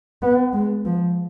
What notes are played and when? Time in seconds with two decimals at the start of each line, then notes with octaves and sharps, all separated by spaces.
0.22 B3
0.53 G#3
0.85 F3